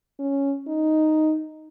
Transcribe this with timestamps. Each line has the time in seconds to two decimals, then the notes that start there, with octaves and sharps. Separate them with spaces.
0.19 C#4
0.68 D#4